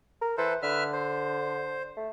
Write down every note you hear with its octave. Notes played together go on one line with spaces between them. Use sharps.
A#4
E3 A4 B4 C5
D3 B4 E5 F6
C5
A3